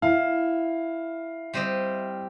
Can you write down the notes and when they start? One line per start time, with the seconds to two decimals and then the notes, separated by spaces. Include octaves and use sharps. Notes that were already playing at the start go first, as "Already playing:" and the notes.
0.02 E4 F5
1.54 G3 C4 D#5